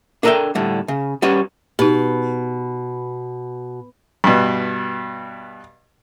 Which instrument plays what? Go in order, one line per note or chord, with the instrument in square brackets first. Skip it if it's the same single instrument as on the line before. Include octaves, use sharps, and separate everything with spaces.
[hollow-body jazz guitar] D4 A4 A#4 D5 E5 G5
A2 D3 G3
C#3
G3 C#4 F#4 B4 C#5
[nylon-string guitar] B2 [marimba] D#4 G4
[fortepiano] G2 B2